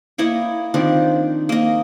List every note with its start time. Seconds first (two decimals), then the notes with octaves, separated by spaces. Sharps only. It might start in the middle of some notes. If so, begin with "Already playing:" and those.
0.18 A#3 E4 C#5 D#5
0.74 D#3 F3 C4 D4
1.49 A#3 D#5